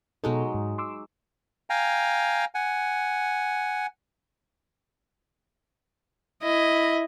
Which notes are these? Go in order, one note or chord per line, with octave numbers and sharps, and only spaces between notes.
B2 F#3 G#3 D#4 A4
G#2
C6 D6 E6
F5 G5 G#5 A#5
F#5 G#5
E4 D#5